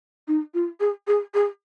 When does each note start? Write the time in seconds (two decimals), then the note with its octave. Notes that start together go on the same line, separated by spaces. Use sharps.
0.28 D#4
0.54 F4
0.80 G#4
1.07 G#4
1.34 G#4